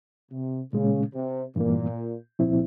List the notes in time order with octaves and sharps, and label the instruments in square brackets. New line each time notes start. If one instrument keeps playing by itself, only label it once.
[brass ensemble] C3
[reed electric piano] A#2 G#3 C#4 [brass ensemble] C#3
[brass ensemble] C3
[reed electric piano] G2 E3 A#3 [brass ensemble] A#2
[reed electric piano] C2 A#2 F3 C4 E4